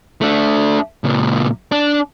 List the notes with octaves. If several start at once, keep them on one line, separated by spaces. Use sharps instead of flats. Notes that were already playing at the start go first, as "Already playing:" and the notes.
A3 D4
C#2 A#2
D4